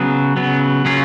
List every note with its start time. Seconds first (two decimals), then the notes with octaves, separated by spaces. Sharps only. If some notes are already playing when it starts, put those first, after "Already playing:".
Already playing: C#3 F#3 B3
0.36 C#3 F#3 B3
0.85 C#3 F#3 A#3 C#4 F4